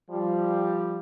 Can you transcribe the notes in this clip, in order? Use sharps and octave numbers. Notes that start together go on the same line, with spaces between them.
F3 G3